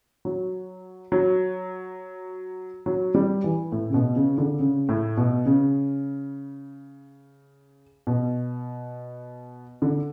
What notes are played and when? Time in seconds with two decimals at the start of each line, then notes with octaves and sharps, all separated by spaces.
0.25 F#3
1.12 F#3
2.86 F#3
3.14 G3
3.44 E3
3.72 A2
3.90 C#3
3.94 B2
4.16 C#3
4.38 D3
4.59 C#3
4.89 A2
5.17 B2
5.46 C#3
8.07 B2
9.82 D3